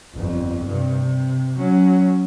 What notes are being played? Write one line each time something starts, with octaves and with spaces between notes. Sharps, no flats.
G1 F2
G2 C3
C3
F#3 C#4